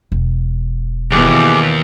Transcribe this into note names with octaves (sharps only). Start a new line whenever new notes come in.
E1
D#2 B2 E3 G4 G#4